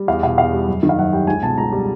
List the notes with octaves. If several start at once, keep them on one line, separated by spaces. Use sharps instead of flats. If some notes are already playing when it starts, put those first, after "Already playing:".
Already playing: G3
E2 F5
B2 F5
E2 F5
G3
F#2
D#3
F5
F#2 F#5
G3 G5
C#2 G#5
B2 A5
C#2 A#5
G3